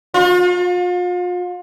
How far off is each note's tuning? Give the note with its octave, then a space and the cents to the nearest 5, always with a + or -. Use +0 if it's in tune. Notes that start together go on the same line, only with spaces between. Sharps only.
F4 +40